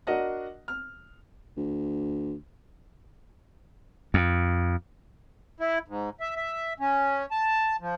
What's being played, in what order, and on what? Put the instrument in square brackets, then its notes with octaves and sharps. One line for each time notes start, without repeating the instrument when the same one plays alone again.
[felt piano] D4 F#4 A#4 D#5 F#5
F6
[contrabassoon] D2
[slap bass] F2
[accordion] E4
G#2
E5
E5
C#4
A5
F3